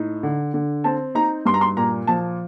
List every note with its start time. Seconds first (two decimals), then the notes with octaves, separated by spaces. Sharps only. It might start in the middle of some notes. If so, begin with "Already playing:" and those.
Already playing: A2 D#4
0.23 D3
0.54 D3
0.84 C4 A5
1.15 D#4 A#5
1.45 G2 C6
1.54 A#5
1.61 C6
1.77 A#2 A#5
2.07 F3 A5